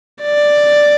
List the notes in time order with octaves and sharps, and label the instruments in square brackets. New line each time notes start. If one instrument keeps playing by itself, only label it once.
[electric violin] D5